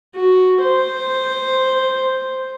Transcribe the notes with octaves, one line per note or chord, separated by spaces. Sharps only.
F#4
C5